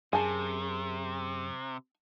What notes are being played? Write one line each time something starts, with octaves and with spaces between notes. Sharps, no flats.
F#2 C3 G#4 G#5 A5